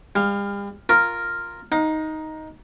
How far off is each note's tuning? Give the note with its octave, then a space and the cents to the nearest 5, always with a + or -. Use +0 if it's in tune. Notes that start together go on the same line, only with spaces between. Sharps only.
G3 +45 F5 +0
F4 +0 A#4 +0
D#4 +5 F5 +45